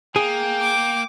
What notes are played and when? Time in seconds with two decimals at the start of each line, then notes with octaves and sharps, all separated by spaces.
0.16 A#3 G#4 G5
0.61 D6